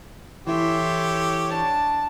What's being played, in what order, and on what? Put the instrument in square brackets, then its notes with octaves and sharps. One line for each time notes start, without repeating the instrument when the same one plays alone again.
[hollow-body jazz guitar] E3 E4 [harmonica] G4 A4 C#5 [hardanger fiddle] E5 C6
[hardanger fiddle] D4 A5